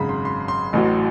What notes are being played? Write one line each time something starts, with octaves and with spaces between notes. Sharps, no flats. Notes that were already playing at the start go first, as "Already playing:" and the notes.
Already playing: G#1 F#2 C#3 A#5 B5
C6
C6
C6
A1 A2 F#3